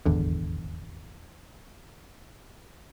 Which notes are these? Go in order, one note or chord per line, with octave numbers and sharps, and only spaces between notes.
D#1 G#1 E2 D3